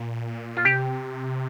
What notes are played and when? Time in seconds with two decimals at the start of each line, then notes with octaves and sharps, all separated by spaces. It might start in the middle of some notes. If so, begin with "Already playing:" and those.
Already playing: A#2
0.57 F4
0.65 C3 G4